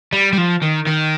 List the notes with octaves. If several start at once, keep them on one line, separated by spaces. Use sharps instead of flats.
G3
G3
F3
D#3
D#3